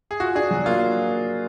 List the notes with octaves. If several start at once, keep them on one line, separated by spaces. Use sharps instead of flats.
G#4
F4 F#4
D4 G#4
F#3
A#3 F4